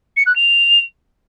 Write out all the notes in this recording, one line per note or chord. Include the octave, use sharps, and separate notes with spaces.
C#7
F#6
F7